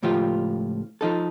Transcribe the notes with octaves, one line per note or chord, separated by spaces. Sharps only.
C#2 A2 F3 F4 G4
F3 D#4 A4